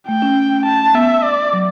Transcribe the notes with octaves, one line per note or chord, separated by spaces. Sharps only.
A3 G5
C#4
A5
B3 E5
D5
F#3